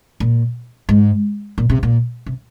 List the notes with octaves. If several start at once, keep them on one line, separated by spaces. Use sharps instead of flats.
A#2
G#2
A#2
C3
A#2
C3